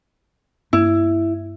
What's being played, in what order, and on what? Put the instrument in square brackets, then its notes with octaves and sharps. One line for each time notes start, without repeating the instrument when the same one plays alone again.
[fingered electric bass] G2 A#3 [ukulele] E4